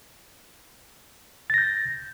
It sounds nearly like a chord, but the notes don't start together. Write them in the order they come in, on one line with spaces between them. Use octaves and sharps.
A6 A#6 G6